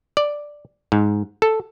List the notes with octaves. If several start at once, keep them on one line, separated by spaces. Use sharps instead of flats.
D5
G#2
A4